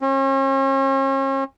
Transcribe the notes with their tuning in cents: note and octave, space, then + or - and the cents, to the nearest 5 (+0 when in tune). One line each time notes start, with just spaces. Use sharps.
C#4 -40